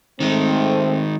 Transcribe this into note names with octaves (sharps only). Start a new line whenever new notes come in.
D#3 G#3 A3 C4